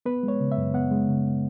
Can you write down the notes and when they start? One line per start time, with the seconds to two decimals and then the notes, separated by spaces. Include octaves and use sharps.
0.06 B3 B4
0.23 G#3
0.28 C#5
0.40 C#3
0.52 E5
0.57 F#2
0.74 B3 F#5
0.91 G#3
1.09 C#3